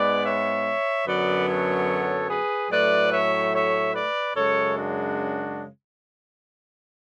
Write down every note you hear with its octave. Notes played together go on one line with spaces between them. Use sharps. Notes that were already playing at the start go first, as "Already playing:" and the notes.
Already playing: G#2 G#3 B3 B4 D5
C#5 E5
F#2 D3 F#3 B3 B4 D5
A4 C#5
G#4 B4
A2 F#3 A3 B4 D5
C#5 E5
C#5 E5
B4 D5
F#2 C#3 G#3 A4 C#5
D4 F#4